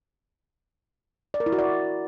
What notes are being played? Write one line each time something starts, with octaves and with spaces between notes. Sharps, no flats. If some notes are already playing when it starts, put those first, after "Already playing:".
D5
A#4
E4
F#4
D5